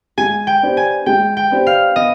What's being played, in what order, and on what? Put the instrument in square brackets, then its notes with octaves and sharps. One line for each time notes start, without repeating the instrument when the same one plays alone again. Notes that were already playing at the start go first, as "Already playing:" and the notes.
[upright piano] G#3 [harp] G#5
[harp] G5
[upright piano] B3 D4 G4 C5
[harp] G#5
[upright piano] G#3 [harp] G5
[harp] G5
[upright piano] B3 D4 G4 C5
[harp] F5
[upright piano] B3 [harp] D#5